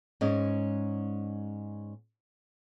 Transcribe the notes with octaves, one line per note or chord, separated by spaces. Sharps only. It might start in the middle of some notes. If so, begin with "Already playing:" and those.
G#2 G#3 C#4 D5 D#5